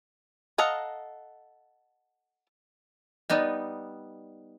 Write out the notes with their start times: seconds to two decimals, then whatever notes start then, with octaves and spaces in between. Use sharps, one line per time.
0.58 A4 D#5 F5 F#5 A#5
3.30 G3 B3 D#4 D5 D#5